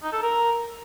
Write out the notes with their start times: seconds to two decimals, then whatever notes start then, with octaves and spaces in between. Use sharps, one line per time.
0.03 D#4
0.13 A4
0.23 A#4